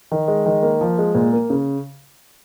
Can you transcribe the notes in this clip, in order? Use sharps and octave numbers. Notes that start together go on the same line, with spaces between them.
D#3
G#3
D#3
A#3
F3
G#3
A#2
A#3
C#3